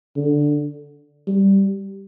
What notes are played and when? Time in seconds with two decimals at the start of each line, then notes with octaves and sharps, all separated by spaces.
0.16 D3
1.27 G3